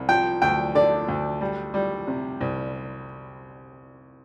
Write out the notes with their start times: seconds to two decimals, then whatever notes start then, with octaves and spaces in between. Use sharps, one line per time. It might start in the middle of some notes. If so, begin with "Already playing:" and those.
Already playing: C2
0.09 F3 G5
0.42 D2 G5
0.75 D3 D5
1.08 D2
1.41 G3
1.74 G3
2.07 C3
2.41 C2